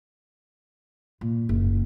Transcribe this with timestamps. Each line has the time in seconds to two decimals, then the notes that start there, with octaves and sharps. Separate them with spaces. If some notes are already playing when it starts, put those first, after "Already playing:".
1.21 A#2
1.49 F#1